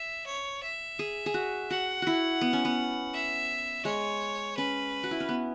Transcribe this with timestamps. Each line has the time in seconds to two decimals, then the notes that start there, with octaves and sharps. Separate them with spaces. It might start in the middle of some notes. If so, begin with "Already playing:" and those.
Already playing: E5
0.27 C#5
0.63 E5
0.99 G#4
1.26 G#4
1.34 F#4
1.70 F#4 F#5
2.02 E4 F#4
2.41 B3
2.53 C#4
2.65 B3
3.14 E5
3.85 G#3 C#5
4.57 C#4 B4
5.03 F#4
5.11 E4
5.20 C#4
5.29 B3